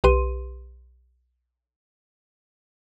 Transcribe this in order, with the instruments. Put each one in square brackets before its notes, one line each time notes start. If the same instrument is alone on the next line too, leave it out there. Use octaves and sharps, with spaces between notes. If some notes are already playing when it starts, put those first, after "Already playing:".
[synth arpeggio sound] B1 G4 B4 C6 D#7